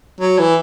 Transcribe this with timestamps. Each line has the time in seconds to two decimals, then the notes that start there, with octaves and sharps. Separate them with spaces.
0.21 F#3
0.39 E3